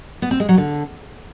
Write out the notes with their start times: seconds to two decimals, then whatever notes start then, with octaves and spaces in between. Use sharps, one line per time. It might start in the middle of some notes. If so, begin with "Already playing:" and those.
0.22 B3
0.31 C4
0.40 G#3
0.49 F#3
0.58 D3